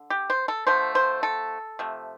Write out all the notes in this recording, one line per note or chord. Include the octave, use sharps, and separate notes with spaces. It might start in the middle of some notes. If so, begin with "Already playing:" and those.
Already playing: D3
G4
C5
A4
D3 F3 A3 C5
C5
A4
C3 F3 A3